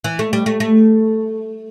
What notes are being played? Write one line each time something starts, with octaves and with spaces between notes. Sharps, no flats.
E3
A3
G3
A3
A3